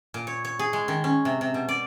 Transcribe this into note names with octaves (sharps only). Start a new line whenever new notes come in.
A#2
C#5
C#5
G#4
G#3
D#3
C#4
C3
C3
B2
D5